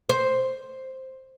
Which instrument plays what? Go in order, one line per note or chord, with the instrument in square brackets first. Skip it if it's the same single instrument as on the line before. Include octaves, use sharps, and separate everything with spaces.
[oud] C5